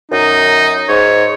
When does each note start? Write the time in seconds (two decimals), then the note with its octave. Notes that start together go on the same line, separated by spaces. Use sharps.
0.11 F#2 D#4
0.89 G#2 C#5